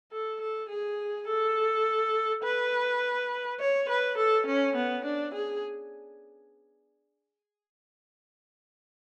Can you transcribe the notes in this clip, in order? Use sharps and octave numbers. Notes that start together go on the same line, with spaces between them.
A4
A4
G#4
A4
B4
C#5
B4
A4
C#4
B3
D4
G#4